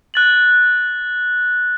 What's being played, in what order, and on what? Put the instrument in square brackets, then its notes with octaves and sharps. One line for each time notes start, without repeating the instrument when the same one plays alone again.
[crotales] F#6 A6 F#7